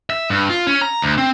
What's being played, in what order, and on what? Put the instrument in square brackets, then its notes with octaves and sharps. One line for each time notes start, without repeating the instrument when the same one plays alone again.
[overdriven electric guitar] E5
G2
F4
C#4
A#5
D2
C4